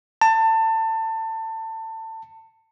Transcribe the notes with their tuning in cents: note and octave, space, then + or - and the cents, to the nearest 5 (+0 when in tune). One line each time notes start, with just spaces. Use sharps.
A5 +25